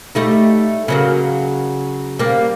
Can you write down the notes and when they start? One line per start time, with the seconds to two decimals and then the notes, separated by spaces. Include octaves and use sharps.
0.15 G3 A3 D#4
0.88 C#3 F#3 A#3
2.19 G3 A#3